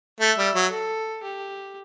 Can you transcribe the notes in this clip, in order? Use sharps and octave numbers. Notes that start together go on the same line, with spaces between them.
A3 E5
G3
F#3
A4
G4